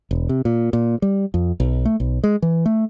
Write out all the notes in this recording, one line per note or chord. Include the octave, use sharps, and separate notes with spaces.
E1
C3
A#2
A#2
G3
F2
B1
A3
B1
G#3
E3
A3